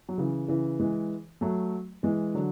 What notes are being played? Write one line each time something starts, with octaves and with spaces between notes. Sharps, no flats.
F#3
C#3 E3
C#3 E3
E3 G#3
F#3 A3
E3 G#3
D3 F#3